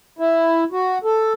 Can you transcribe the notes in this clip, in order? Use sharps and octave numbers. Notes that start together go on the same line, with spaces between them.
E4
F#4
A4